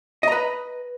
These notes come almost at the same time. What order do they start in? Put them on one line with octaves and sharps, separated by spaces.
D#5 A#5 B4